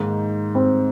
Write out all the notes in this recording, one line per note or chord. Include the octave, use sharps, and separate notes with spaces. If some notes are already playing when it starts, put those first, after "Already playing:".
Already playing: G#2 D#3 A#3 D#4
C4